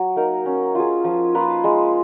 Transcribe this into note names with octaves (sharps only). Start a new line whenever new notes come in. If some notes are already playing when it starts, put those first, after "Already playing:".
Already playing: F#3
A#3 D#4 A#4
C#4
F4 G#4
F3
A#3 F4 B4
G#3